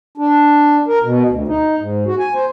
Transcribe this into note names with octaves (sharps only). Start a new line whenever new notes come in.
D4
A#4
B2
D2
D#4
G#2
F#4
G#5
C5